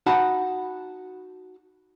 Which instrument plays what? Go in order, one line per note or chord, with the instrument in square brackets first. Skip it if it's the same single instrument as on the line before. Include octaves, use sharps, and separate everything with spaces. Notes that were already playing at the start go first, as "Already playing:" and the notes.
[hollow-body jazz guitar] D#4 F#4 F#5 A5 B5